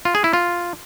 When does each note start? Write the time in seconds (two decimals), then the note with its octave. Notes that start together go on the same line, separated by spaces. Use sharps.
0.05 F4
0.15 G#4
0.24 E4
0.33 F4